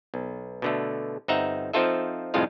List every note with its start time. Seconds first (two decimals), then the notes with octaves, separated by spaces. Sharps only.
0.14 B1
0.62 B2 D3 A3
1.28 G1 C4 D#4 E5 F#5 A#5
1.73 F3 C4 D#4 F4 A4 E5
2.34 C2 F2 A2 G#3 F4 F5